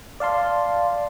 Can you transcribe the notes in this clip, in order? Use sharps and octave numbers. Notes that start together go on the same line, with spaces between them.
D5 F5 A5 C6